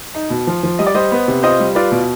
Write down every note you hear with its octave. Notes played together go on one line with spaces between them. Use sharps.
D#4
B2
F3
F3
G3 D#5
D5
G3 C5 D#5
B3
C3
F4 C5 D#5
G3
F4 B4 D5
B2